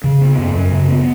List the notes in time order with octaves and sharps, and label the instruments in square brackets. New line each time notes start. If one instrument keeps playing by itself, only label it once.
[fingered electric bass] C#3
B3
F#2
F#2
C#3
B3